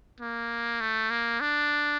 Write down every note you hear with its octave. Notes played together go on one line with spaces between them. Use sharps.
A#3
A3
A#3
D4